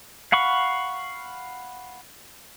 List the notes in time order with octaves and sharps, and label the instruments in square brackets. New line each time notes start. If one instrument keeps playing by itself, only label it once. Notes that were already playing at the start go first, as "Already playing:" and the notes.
[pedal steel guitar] F5 F#5 B5 C#6